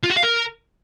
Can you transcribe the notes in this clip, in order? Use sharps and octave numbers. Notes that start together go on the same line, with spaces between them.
F4
F#4
F5
A#4